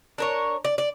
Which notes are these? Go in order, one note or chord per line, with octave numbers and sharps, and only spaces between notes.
D4 A#4 C#5
D5
D5